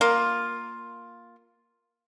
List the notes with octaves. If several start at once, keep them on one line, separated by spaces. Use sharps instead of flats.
A#3 F4